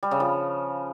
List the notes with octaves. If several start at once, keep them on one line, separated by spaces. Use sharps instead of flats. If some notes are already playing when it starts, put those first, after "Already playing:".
G3
C#3
F3